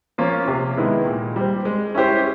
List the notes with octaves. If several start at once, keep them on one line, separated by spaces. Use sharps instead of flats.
F3 A#3 C#4 F4
C3
D#3 G#3 B3 E4
A#2
G3 C4
G#3
C#4 E4 G4 C5